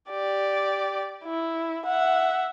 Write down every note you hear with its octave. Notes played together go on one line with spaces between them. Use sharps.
G4 D5
E4
E5 F#5